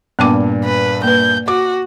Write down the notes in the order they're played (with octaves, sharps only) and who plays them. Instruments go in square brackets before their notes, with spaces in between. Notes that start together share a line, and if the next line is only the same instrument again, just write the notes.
[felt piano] G2 A#2 D#7 [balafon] B3 A5 D6
[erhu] B4
[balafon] A#3 B4 [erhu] G6
[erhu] F#4 [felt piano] D6